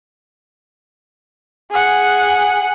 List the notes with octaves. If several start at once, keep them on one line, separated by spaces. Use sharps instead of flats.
G#4 F#5